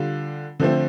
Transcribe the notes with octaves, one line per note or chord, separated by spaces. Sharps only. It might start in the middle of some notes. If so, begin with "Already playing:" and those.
Already playing: D3 G3 F4
D3 F3 A3 C4